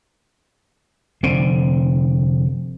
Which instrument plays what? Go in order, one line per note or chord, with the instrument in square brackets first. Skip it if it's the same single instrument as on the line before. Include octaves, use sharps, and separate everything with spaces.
[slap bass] F1 D3 C4